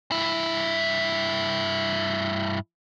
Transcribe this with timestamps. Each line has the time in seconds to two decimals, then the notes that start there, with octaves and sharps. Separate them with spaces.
0.12 G2 E4